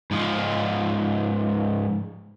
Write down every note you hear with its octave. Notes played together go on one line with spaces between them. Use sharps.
G#2 F3